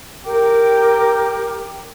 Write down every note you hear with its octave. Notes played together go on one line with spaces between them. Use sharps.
G4 A#4 G5 D6